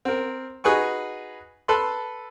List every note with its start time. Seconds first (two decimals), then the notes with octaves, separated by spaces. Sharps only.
0.05 C4 A#4
0.64 D#4 F#4 G#4 B4 G#5 C#6
1.68 A4 B4 A5 B5 C6